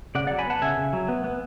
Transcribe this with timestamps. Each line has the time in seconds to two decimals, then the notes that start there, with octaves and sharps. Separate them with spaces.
0.15 C#3 D5 F#5
0.27 F#3 D5 F#5
0.39 G#5 B5
0.47 B3 F#5 A5
0.62 C#3 E5 G#5
0.77 C#3
0.93 F#3
1.08 B3
1.24 B3